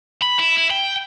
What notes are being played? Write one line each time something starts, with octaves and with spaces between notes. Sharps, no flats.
B5
E4
E4
G5